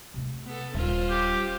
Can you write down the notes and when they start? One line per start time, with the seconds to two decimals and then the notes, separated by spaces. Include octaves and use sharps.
0.14 C3 A3
0.45 B3 A4
0.75 D#1 G3 C#4 F4 C5
1.10 G4